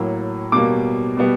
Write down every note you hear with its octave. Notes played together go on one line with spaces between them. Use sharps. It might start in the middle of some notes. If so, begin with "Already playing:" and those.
Already playing: A2 F#3 A#3
B2 G3 A#3 D6
B2 G3 B3